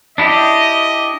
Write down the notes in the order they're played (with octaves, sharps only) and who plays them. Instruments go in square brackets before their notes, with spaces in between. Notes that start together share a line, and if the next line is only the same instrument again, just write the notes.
[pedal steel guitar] D4 E4 G4 [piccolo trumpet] D#5